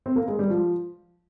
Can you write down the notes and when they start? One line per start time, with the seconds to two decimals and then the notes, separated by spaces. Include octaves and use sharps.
0.06 C4
0.16 A#3
0.28 G#3
0.39 G3
0.50 F3